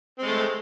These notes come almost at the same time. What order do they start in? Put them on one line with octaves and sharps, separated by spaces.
C4 G#3 A3